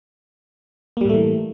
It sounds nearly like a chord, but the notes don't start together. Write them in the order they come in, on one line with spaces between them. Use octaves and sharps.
A#3 G3 A2 A3 E3